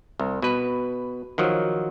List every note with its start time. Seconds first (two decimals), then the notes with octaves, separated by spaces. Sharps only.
0.19 C2
0.42 B2 B4
1.38 D#3 F3 F#3